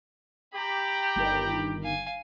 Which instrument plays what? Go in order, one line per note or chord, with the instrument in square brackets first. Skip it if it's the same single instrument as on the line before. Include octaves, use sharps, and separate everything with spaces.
[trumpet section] G4 [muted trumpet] G5 [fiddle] A#5 B5
[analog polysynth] G1 D#3
[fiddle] F5 G#5